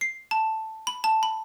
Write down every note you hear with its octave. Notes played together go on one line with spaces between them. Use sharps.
C7
A5
B5
A5
B5